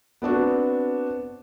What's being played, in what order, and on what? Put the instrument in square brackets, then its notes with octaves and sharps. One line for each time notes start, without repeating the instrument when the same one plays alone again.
[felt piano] B3 C4 D4 F#4